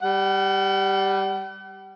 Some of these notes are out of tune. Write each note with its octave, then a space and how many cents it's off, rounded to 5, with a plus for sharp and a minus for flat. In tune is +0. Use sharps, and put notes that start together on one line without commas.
G3 +0 F#5 +45